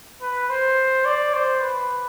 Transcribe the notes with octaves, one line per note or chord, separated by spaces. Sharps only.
B4
C5
D5
C5
B4